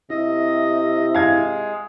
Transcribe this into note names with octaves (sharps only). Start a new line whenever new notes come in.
C3 E4 D#5
G#3 F5 G#6